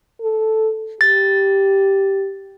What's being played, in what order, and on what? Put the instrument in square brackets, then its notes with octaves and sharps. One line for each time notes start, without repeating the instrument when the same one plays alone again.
[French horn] A4
[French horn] G4 [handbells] A6